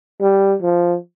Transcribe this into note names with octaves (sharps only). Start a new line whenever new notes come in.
G3
F3